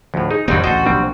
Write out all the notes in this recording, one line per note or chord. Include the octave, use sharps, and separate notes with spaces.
D2 A2 F3
D#4 G#4
F2 D#3 F#3 G3 A#3 C4 D#4
A1 D2 F#4 A4 C5 D#5
B1 F3 G3 A#3 C4 D4